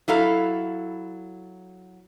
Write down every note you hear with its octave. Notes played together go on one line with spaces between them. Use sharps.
F#3 E4 A4 F5